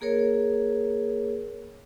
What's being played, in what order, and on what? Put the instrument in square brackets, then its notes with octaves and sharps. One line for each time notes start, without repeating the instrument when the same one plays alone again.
[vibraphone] A#3 G#4 A#4 C#5